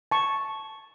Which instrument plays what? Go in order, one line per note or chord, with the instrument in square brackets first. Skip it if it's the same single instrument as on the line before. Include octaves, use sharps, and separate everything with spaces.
[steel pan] A5 C#6